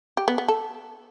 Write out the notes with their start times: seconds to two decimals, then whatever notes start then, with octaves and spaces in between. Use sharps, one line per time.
0.17 G4
0.28 B3
0.38 B3
0.48 A4